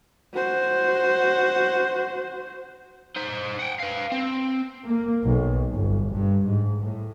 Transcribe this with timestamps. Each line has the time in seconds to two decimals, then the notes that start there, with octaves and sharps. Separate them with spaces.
0.34 F#4 C5
3.16 D#4 C5
3.59 F#5 G5
3.80 B4 F5
4.12 C4
4.86 A#3
5.24 B1
5.73 G1
6.14 G2
6.46 G#2
6.81 A2